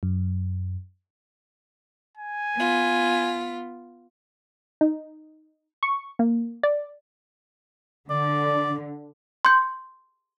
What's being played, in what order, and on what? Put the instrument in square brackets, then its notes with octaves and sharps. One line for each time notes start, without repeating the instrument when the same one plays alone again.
[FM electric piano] F#2
[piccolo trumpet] G#5
[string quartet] B3 F4
[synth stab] D#4
C#6
A#3
D5
[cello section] D3 [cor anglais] D5
[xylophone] C6 G6